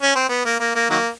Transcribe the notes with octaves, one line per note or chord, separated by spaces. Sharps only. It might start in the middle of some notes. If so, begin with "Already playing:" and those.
C#4
C4
B3
A#3
A#3
A#3
D#3 F#3 A#3